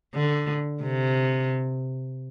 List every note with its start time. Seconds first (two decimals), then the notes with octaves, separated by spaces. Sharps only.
0.15 D3
0.82 C3